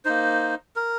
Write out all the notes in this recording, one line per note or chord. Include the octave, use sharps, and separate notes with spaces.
A#3 D#4 C5
A#4